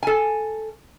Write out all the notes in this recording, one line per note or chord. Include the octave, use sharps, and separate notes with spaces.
A4 G#5